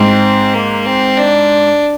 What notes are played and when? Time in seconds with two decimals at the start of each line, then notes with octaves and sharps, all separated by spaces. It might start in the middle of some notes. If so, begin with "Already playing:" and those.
Already playing: G#2 C4
0.54 A#3
0.86 C4
1.17 D4